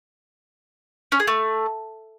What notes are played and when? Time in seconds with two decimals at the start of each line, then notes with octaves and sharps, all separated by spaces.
1.12 C#4
1.20 G#4
1.27 A3